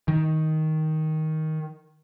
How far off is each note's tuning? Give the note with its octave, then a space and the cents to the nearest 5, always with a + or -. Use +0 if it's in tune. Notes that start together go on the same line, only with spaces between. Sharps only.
D#3 +10